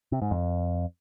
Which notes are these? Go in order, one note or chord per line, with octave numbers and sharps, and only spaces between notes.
C3
G#2
F2